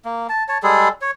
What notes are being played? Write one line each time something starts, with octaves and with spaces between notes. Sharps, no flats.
A#3
A5
C#5 A5
G3 G#3 G#4 A4
C#5